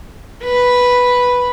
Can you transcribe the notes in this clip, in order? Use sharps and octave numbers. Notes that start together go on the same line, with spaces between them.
B4